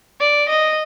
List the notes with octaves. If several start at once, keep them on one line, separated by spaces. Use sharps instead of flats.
D5
D#5